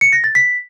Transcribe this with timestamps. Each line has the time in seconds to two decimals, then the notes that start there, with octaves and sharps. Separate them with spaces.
0.01 C#7
0.13 A#6
0.24 A6
0.35 B6